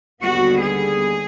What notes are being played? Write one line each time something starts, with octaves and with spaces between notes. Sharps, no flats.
D#2 D3 G3 B3 F#4
G#4